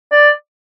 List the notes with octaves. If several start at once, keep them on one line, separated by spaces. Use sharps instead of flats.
D5